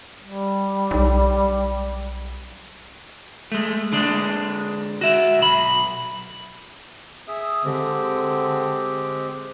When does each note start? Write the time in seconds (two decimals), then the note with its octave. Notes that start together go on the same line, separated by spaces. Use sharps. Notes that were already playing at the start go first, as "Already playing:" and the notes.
0.24 G3
0.91 B1
3.52 G#3 A3
3.93 D3 G#3 D4
5.01 F#4 E5
5.39 B1 B5
7.28 G#4 E5 D#6
7.64 D3 G#3 C4 G4